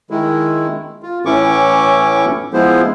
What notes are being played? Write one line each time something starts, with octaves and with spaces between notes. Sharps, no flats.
D#3 G#3 E4
F4
A2 E3 C#4 E4 C#6 D6
F3 G#3 B3 E4 C5